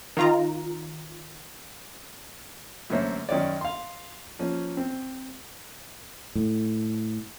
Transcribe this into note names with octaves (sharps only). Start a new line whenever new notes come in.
D#3 F4 A#5
F#2 D3 A3 A#3 C5 C#5
F#2 D#3 C#5 D5
F5 C6
F3 A#3 C#4
C4
A2